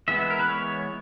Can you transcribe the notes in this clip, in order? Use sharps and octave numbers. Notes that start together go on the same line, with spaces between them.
E3 G#3 B3 E5
A#4
B4
C#5